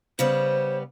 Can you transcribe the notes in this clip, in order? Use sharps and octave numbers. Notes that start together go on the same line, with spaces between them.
C#3 G3 B3 C5